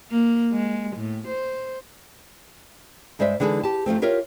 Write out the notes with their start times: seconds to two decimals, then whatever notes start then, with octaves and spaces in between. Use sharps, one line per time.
0.11 A#3
0.52 G#3
0.97 A2
1.28 C5
3.19 G2 G#3 C5 D5 E5
3.40 D3 E3 G#3 D#4 A4
3.63 G4 A5
3.86 F#2 F3 A3 C4
4.02 F4 G4 A#4 C#5 E5 F5